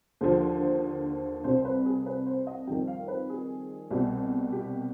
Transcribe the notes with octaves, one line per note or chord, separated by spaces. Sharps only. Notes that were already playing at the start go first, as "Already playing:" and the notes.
D#2 D3 F3 C5
C2 C3 G3 C5
B4
G#4
B4
C5
D#5
F2 D#3 G3 G5
F5
B4
G#4
C2 B2 G3
G4